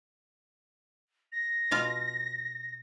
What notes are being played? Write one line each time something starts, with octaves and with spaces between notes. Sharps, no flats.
A#6
B2 F4 F5